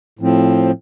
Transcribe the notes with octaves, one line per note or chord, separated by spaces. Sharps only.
A2 F3 C4